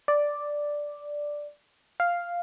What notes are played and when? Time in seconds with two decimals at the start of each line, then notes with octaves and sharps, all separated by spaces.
0.08 D5
2.00 F5